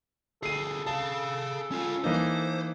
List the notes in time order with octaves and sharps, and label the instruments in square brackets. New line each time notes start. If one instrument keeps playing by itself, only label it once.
[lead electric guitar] D2 G#4 [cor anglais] A4 [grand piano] C7 D#7
[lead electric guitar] G#4 F5 [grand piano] A5
[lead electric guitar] C#4 F4
[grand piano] E3 A#3 D#4 [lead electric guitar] C5